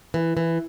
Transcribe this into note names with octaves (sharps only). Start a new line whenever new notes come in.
E3
E3